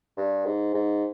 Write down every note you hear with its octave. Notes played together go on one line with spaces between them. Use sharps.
G2
G#2
G#2